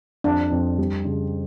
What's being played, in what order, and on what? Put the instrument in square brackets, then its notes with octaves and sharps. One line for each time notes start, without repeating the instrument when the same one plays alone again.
[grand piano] F2 [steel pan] D4
[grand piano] F2
G3
C#3